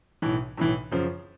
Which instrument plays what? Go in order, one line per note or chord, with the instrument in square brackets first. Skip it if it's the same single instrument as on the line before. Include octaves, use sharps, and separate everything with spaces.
[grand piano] B1 A2 E3
B1 A2 E3
F#2 C#3 F3